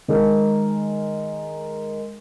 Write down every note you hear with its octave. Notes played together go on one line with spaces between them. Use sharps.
D#3 G#3 G#4 A#4